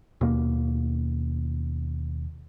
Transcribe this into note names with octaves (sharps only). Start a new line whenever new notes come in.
D#2 B2 A#3